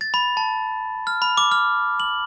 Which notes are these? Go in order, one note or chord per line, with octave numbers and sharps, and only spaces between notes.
A6
B5
A5
F6
B5
D6
F6
F#7